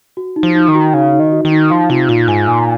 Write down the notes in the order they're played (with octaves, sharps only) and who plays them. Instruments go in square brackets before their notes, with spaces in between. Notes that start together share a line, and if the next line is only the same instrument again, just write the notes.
[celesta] F#4
D#4
[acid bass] F3
[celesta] D#4
[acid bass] D#3
[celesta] F#4
[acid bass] C#3 [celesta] D#4
[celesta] D#4
[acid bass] D#3
[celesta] F#4
[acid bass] D#3
[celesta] D#4
[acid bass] F3 [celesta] F5
[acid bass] C3 [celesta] F4
[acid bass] A#2 [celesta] F4
[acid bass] G#2 [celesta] G#5
[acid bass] A#2 [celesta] G#5